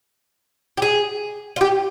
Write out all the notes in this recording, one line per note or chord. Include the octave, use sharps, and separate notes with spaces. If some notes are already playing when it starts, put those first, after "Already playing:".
G4
G#4
F4
G4